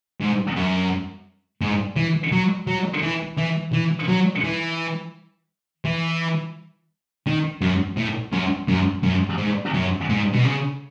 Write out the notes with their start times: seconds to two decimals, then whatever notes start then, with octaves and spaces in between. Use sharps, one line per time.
0.20 G#2
0.56 F#2
1.61 G#2
1.96 E3
2.32 F#3
2.67 F#3
3.03 E3
3.38 E3
3.73 E3
4.09 F#3
4.44 E3
5.85 E3
7.27 D#3
7.61 F#2
7.97 A2
8.33 F#2
8.68 F#2
9.03 F#2
9.38 G#2
9.74 F#2
10.09 G#2
10.33 B2
10.45 C#3